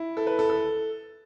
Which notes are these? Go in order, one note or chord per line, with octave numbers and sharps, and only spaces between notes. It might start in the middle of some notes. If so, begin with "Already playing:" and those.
Already playing: E4
A4
B4
A4
A4